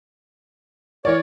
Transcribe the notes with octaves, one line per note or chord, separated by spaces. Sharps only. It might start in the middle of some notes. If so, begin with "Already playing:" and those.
E3 A#4 C#5 D5